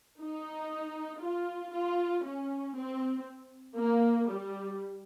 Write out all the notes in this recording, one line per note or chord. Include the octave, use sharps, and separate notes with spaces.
D#4
F4
F4
C#4
C4
A#3
G3